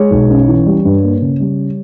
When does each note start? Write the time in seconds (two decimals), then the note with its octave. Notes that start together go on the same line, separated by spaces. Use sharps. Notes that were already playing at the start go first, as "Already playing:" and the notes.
Already playing: G#3 C#5
0.11 B1
0.30 C#4
0.48 E3
0.66 G3
0.85 G2
1.03 A#3
1.22 C#3
1.40 G3